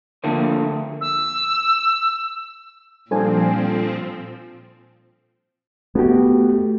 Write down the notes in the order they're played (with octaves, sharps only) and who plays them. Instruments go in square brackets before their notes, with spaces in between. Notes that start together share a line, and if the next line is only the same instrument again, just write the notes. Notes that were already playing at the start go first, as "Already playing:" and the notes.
[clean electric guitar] D3 F3 A3 A#3 C4
[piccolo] E6
[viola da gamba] A#2 [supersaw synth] F3 C4 [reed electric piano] G3 D4 [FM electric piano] A4 C5 G#5
[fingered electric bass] A3 [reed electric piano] B3 F#4 G4